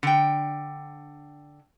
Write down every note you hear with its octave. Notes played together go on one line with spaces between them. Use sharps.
D3 G5